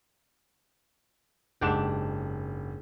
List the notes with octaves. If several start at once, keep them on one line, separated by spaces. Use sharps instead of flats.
F#1 G#2 D4 G4 F#5 E7